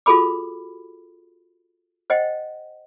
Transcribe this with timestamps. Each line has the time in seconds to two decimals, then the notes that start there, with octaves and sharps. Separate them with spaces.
0.06 F4 F#4 G#4 A4 B5 D6
2.10 C5 D#5 F#5 G5